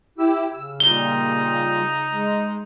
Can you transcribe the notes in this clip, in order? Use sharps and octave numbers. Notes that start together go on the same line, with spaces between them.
E4 G4 E6
C#3 E6
A#2 G3 D#4 G7
G#3